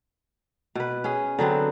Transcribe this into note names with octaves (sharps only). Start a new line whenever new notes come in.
B2 B4
C#4 G#4
D3 F#3 B3 C4